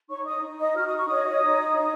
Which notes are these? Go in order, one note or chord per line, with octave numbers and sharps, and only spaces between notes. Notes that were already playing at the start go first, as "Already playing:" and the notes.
D#4 C#5 C#6
D#5 D#6
D#4
D#5 D#6
F#4 F6
D#6
C#6
C#5 D#5 D#6
D#4
D#4